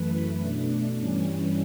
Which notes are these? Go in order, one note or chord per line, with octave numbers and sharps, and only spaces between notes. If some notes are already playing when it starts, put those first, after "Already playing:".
Already playing: F#2 E3 A3 B4
B2 A3 D4
G2 E3 G3 C#4